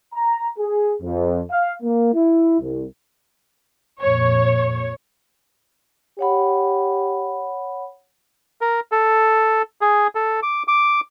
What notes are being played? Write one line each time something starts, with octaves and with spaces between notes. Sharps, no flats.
A#5
G#4
F2
F5
A#3
E4
C2
F2 A#2 C#5
G4 C#5 F#5 B5
A#4
A4
G#4
A4
D6
D6